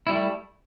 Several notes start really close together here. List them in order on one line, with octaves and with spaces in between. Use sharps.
E4 G3 A3